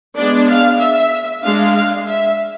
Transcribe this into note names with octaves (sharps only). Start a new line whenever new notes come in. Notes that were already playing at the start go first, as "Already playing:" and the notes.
G#3 B3 D4 D5
F5
E5
G#3 D4 F5
F5
E5